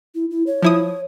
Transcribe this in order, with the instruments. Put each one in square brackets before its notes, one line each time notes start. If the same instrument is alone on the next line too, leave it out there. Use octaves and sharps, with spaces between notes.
[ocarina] E4
E4
C#5
[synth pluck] F3 E4 D#6